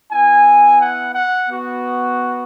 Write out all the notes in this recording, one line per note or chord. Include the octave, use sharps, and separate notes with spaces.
B3 E4 G#5
F#5
F#5
B3 F#4